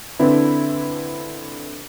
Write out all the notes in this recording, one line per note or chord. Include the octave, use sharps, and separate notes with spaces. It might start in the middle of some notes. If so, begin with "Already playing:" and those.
D3 C4 D4 E4 B4